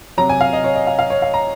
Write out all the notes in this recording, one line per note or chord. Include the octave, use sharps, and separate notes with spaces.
C3 F#3 A#5
G#5
F5
D#5
C#5
D#5
F5
F5
C#5
F5
A#5